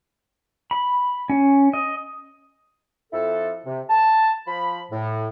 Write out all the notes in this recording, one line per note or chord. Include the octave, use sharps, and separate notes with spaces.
B5
C#4
D#5
F2 E4 A4
C3
A5
F3 B5
A2